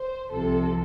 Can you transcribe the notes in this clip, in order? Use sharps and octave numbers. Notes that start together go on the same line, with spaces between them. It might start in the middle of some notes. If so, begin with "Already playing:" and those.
Already playing: C5
C2 C3 F3 A4